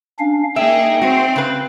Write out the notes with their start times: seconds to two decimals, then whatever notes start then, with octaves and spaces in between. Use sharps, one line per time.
0.19 C#4 D4 F5
0.56 A#3 D#4 G#4 E5 G5
1.02 C4 F#4 C#5
1.36 C#3 B4